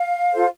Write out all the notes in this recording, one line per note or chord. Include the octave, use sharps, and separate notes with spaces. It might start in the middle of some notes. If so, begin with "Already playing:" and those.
Already playing: F5
F4 A4 C5